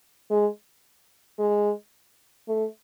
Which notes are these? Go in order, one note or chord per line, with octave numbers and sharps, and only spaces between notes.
G#3
G#3
A3